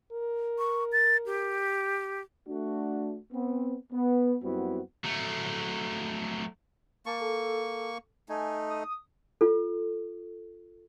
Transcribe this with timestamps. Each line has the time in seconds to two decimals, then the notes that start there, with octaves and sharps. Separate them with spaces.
0.12 A#4
0.59 C#6
0.92 A6
1.26 G4
2.48 A3 D4 F#4
3.33 B3 C4
3.93 B3
4.43 F#2 G3 B3 C4 E4 F#4
5.05 F#3 A3
7.06 A#3 A5 C#6
7.21 A4
8.29 A3 D#4 G#5
8.70 D#6
9.41 F4 A4